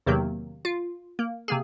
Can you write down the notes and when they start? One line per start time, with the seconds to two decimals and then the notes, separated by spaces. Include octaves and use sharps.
0.06 E2 C3 D#3 F#3 A#3
0.65 F4
1.19 A#3
1.48 C3 A#3 G#4